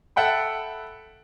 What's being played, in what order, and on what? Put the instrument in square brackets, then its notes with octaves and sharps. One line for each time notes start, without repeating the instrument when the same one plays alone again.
[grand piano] A4 E5 F#5 G5 B5